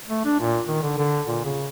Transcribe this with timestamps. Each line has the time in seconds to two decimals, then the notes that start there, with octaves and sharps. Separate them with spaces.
0.09 A3
0.25 D4
0.40 A#2
0.68 D#3
0.83 D3
0.98 D3
1.27 A#2
1.45 C#3